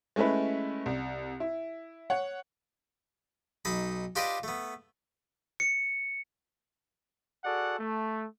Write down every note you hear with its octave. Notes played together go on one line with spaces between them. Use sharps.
G#3 A3 C#4 E4 B4
C2
E4
C#5 F#5
B1 D#4 A5 B5
D4 F4 G4 B4 D5 D#5
A3 B3
C#7
F#4 G#4 A4 D5 F#5
A3